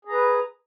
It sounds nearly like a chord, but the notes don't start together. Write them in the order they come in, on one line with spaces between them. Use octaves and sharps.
G#4 A#5 B4